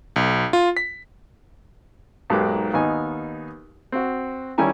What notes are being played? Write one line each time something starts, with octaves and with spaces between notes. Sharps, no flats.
B1
F4
B6
B1 G#2 A#3 G4 B4 D6
D#2 B3 D#4 G#5
C4 F#4
D#3 G3 C#4 E4 G#5 A#5